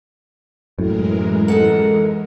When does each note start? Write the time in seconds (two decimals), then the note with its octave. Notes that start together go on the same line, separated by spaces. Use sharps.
0.79 F#2 A2 E3 G#3 A#4
1.48 D#4 A4 F#5